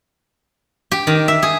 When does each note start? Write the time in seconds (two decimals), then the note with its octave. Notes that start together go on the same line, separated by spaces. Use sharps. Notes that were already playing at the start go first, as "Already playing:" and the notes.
0.92 G4
1.07 D#3
1.28 E5
1.43 G#4